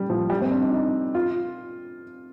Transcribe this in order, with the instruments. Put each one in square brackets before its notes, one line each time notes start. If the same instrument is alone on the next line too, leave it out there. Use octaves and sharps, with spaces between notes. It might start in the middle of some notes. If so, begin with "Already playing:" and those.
Already playing: [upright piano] G3
F3
G3
C4
D4
D#4
D#4
F4